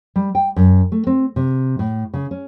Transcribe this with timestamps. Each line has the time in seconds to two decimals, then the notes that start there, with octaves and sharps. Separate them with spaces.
0.16 G3
0.35 G5
0.56 F#2
0.92 A3
1.07 C4
1.36 C3
1.79 A2
2.14 C#3
2.31 C#4